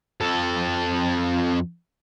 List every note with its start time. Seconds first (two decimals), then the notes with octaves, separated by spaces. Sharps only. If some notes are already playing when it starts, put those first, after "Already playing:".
0.21 F2 A4